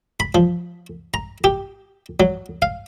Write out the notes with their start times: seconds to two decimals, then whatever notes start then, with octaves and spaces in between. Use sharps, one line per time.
0.20 B5
0.35 F3
1.14 A#5
1.44 G4
2.20 F#3
2.62 F5